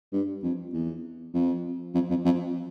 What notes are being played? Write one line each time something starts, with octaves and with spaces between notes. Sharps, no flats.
G2
F2
E2
F2
F2
F2
F2